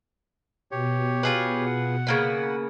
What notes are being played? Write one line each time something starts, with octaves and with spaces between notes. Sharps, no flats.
B2 G4 C#5
F4 G#4 B4
F#5
C#3 A#3 B3